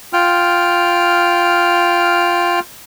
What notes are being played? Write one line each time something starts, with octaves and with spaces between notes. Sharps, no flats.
F4 G5 F6